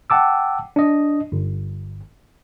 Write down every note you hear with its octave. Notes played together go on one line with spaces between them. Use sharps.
F#5 G5 A5 D6 E6
D4 D#5
G1